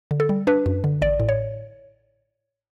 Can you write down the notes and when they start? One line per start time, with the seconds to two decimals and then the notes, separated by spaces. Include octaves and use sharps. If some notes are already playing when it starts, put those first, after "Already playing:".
0.11 D3
0.20 A4
0.29 G3
0.47 D4 B4
0.66 F#2
0.84 D3
1.02 A1 D5
1.20 A2
1.29 C#5